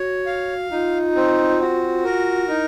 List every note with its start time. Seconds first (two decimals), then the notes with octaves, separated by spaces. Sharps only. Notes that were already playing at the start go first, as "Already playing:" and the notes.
Already playing: F#4 C#5
0.26 F5
0.71 D#4 F4
1.16 C4
1.60 F#4
2.05 A#4
2.48 D#4 E4